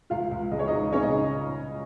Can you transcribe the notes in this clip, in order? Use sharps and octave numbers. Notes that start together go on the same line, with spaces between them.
C#2 F4 F5
C#2
C#3 D#5
C#5
C#2 D#4 D#5
C#3 C#4 C#5
D#4 D#5